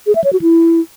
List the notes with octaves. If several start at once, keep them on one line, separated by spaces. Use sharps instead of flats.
G#4
E5
C#5
F#4
E4